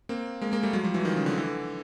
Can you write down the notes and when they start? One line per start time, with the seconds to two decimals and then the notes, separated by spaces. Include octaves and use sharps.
0.09 A#3 C4
0.41 G#3 A#3
0.52 G#3 A#3
0.63 G3 A3
0.73 F#3 G#3
0.83 F3 G3
0.94 E3 F#3
1.05 D#3 F3
1.16 C#3
1.26 D3
1.37 D3 E3